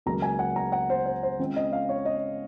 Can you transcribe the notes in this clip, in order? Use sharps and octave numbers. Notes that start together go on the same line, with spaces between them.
C#2 C#3 F#3 A#3 A#5
G#5
F#5
A#5
F#5
C5
C5
C5
C#3 G#3 C4 F4
D#5
F5
C#5
D#5